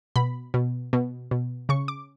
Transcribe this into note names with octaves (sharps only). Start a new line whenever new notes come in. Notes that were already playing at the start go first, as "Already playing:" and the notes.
B2 B5
B2
B2
B2
C#3 C#6
D6